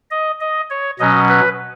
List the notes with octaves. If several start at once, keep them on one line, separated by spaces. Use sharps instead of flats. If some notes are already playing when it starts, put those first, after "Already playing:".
D#5
D#5
C#5
B2 F#3 C#4 D#5
B4